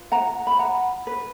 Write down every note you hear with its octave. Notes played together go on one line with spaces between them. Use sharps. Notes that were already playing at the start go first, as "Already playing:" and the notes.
Already playing: F4 B4
F#5 A#5
B5
F#5 A#5
B4